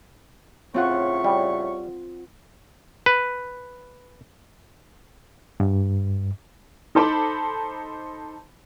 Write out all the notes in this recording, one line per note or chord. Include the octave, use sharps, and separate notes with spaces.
A2 C#3 C4 F4 F#5 C#6
G3
B4
G2
D#4 A4 C5 A5 B5 D6